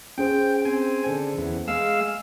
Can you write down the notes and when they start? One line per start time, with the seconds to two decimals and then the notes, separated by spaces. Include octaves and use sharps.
0.18 C#4 G#4 C5 G5
0.65 C4 G#5
1.06 D3
1.37 E2
1.68 G#3 F5 E6